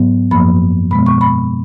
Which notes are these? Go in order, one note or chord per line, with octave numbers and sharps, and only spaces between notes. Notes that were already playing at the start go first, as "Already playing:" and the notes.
Already playing: G#2 F#3 B3
F#2 F3 A#3 B5
B2 G#3 B3 B5
C#6
B5